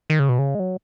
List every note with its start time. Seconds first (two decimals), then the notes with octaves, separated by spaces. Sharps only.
0.10 D#3
0.19 C#3
0.29 B2
0.39 C#3
0.55 G#3
0.59 F#3